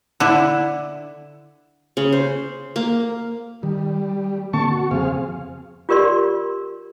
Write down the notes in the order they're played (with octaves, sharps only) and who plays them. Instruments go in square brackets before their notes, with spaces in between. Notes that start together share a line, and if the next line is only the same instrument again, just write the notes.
[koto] D3 E4
[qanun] C#3
C5
A#3
[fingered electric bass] D#3 [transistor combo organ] G3
[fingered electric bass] D3 A#3 C4 [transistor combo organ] A5 C#6
[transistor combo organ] F#4
[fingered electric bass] F2 C#3 F3 [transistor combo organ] C4 G#4 F5
[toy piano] F4 G4 A#4 D5 C6